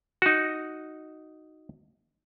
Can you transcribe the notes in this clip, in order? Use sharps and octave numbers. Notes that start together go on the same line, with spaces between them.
D#4 F#4